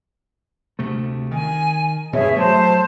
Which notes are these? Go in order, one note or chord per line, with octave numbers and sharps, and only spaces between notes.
D2 C3 A3
D#3 G#5
G2 B2 G#4 C#5 E5
F#3 A3 C5 A5